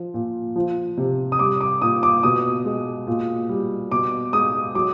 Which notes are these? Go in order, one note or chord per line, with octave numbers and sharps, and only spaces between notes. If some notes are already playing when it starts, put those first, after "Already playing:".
Already playing: F3
A#2
F3
C3
D#6
G3 D6
D6
A#2 D#6
D6
B2 D#6
G#3
A#2
G3
B2 D6
G#3 D#6
F#3 D6